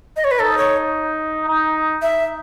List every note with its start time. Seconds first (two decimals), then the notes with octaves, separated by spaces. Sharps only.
0.16 D#5
0.24 C#5
0.31 B4
0.39 D#4 A4
0.58 C#5
1.47 D#4
2.01 D#4 E5